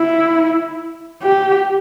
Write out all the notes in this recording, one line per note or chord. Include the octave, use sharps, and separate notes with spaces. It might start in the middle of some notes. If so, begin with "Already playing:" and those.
Already playing: E4
G4